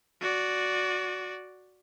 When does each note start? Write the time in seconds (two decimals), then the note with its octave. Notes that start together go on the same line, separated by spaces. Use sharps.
0.21 F#4 D5